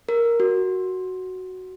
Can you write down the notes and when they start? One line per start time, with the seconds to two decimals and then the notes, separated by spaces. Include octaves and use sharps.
0.09 A#4
0.40 F#4